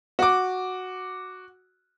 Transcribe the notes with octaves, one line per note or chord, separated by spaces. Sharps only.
F#4 D6